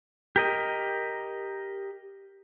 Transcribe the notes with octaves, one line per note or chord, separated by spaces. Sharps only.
G4 A#4 D#5